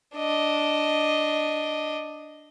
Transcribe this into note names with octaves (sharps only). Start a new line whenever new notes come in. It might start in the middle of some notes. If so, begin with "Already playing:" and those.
D4 D#5